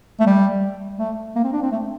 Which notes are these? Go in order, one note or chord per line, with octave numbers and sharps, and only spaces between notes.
A3
G3
A3
A#3
C4
D4
C4
A3